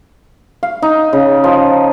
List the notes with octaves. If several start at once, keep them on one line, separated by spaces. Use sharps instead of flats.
F5
D#4
C#3
F3